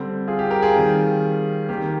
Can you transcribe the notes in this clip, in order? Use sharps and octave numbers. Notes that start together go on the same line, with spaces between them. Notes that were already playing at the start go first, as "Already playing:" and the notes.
Already playing: D3 G3 C4
F4 G#4
G4
G4 A#4
F4 G#4
D#3 G3 C4
D#3 A#3 G4